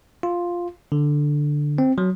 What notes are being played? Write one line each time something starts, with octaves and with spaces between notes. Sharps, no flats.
F4
D3
C4
F#3